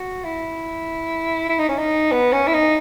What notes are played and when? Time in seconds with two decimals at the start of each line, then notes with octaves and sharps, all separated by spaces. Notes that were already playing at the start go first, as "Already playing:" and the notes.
Already playing: F#4
0.24 E4
1.49 E4
1.59 D#4
1.69 C#4
1.79 D#4
2.12 B3
2.33 C#4
2.47 E4
2.53 D#4